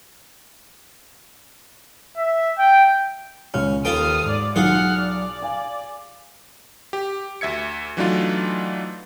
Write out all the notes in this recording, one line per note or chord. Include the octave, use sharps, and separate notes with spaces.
E5
G5
C#2 C#4 F6
D#2 F4 A4 B4 G5 D#6 F6
G#2 D5
B1 F4 G#4 F#5 F6
D5
F5 G#5
G4
D2 E5 G#6 C#7
E3 F#3 A3 D4 D#4 F4